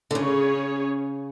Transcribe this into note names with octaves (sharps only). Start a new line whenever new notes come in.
D3
C#3 C#4 G#4 C#5